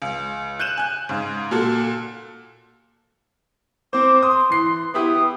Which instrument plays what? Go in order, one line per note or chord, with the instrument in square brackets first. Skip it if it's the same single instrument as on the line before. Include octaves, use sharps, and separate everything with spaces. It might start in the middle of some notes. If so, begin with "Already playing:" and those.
[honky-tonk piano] C#2
F#6 G6 D#7 E7 F#7
G#5 F#6
G#2 C#3
A#2 F#4 A4
[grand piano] C4 C5 [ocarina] D6
[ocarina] C6 [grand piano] D#6
[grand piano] E3 C7
[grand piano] B3 E4 G4 [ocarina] D#6